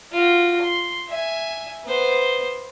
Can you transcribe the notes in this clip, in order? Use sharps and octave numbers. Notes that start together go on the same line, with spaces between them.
F4 F#4
C6
E5 G#5
B3 C5